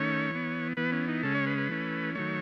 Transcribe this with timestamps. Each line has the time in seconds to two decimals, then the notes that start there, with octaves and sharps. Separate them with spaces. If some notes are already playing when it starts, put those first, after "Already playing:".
Already playing: D#3 A3 C#4 C#5
0.31 E3 B3
0.77 E3 B3 B4
0.92 C#4
1.08 D#4
1.23 C#3 G#3 C#4 A4
1.35 C#5
1.47 B4
1.58 B4
1.69 E3 A3 C#4
2.15 D#3 F#3 A3 C#5